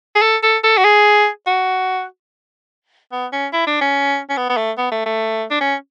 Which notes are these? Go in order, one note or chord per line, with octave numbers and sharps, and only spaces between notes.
G#4
A4
A4
A4
F#4
G#4
F#4
B3
C#4
E4
D4
C#4
C#4
B3
B3
A3
B3
A3
A3
D4
C#4